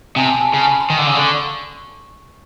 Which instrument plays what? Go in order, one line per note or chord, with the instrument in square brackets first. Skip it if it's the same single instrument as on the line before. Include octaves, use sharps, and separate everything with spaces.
[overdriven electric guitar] C3 [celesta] G#5
[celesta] A5
G#5
A5
[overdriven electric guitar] C#3 [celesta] G#5
[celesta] A5
B5
C6
[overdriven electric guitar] D#3
D3
C#3
D3
[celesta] C#6